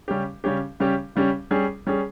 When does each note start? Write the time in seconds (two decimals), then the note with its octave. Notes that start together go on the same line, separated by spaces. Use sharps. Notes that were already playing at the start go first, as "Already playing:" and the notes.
0.08 C#3 G3 C#4 G4
0.44 C#3 G3 C#4 G4
0.80 C#3 G3 C#4 G4
1.16 C#3 G3 C#4 G4
1.51 G3 C#4 G#4
1.87 G3 C#4 G#4